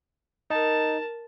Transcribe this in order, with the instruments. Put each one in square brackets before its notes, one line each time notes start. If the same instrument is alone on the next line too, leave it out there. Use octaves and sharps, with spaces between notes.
[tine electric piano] D#4 [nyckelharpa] A#4 A5